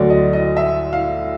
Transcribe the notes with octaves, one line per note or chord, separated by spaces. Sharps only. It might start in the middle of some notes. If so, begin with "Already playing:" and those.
Already playing: D2 D3 F#3 D5
D#5
D#5
E5
F5